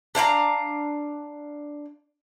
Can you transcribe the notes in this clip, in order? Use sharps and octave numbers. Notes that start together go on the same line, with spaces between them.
D4 F5 G5 A#5